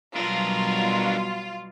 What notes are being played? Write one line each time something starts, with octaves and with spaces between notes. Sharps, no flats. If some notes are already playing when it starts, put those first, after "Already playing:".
B2 F#3 G3 D4 F4 A#4